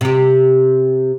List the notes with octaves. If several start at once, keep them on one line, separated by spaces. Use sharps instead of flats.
C3 G4